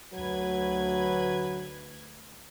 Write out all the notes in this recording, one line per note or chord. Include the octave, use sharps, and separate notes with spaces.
D2 F#3 B4 G#6